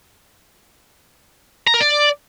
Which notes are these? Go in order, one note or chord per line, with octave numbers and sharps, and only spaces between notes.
A#5
A#4
D5